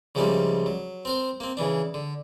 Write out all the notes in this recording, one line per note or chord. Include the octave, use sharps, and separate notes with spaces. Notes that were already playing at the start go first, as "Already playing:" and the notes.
C#2 C#3 F3 G3 A3 A#3
F#3
C4 A#4 C5
A#3 C4
C#3 E3 D4
D3